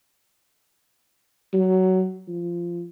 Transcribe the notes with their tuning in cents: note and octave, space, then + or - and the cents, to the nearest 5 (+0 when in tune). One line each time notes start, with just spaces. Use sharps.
F#3 +15
F3 -15